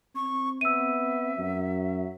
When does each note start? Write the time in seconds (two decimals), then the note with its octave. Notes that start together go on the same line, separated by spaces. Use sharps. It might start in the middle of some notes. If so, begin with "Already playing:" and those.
0.16 C4 C#6
0.61 B3 E5 E6 D#7
1.38 F#2 F#3